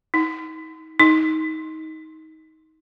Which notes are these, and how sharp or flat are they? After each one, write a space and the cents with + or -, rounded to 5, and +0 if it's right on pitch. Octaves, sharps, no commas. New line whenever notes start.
D#4 +40
D#4 +25